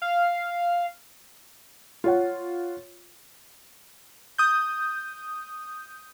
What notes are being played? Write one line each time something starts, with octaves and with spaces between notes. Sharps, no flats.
F5
F4 C#5 F#5
D#6 G6